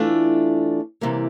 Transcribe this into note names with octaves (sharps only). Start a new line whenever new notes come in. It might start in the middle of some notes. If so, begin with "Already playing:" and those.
Already playing: E3 A3 D4 F4
C3 E3 G3 A#3